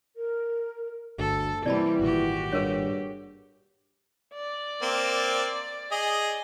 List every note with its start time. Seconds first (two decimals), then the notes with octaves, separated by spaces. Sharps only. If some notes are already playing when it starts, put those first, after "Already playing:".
0.15 A#4
1.19 G1 D2 A4
1.66 C3 E3 G3 A#3 C4 D5 A5 B5
2.00 G#1 A#2 F#4 G4
2.52 G2 G#4 A#4 C#5
4.34 D5
4.82 A#3 C4
5.91 G#4 D#5